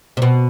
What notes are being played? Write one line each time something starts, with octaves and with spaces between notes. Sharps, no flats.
C3
B2